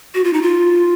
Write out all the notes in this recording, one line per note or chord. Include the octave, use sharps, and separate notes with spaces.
F#4
F4
D#4
F4